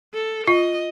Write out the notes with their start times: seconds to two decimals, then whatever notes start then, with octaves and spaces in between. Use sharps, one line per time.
0.14 A4
0.47 F4 D#5